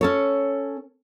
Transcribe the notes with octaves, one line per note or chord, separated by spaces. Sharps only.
C#4 A4 C#5